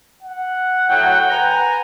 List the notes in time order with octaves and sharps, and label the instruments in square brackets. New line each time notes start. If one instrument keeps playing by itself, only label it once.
[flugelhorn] F#5
[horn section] A2 F#3 [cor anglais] G5
[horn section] B4 G#5 A#5